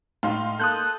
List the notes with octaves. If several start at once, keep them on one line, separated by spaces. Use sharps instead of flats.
A2 D#4 F5 C6
A#3 A4 D#6 F#6 G6